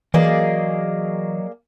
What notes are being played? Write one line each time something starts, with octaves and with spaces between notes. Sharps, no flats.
E3 F#3 A#3 G#4 A#4 D5 D#5